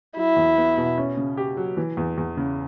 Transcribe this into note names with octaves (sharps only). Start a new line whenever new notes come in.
F#3 E4
E2
B3
B2
C#4
C#3
G4
F#3
E3
E2
E2
C#3